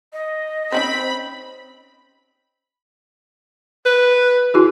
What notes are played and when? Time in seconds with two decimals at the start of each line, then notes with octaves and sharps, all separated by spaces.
0.13 D#5
0.72 C4 C#4 D#4 C5 B5
3.86 B4
4.54 E4 F#4 G#4